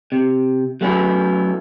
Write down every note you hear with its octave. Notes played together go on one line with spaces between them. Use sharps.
C3
F#3 A3 B3 C#4 E4